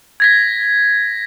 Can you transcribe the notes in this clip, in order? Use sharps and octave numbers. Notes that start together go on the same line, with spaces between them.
G#6 A#6 B6